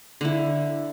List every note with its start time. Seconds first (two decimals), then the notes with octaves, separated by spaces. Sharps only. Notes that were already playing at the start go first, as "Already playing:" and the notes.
0.21 D3 E4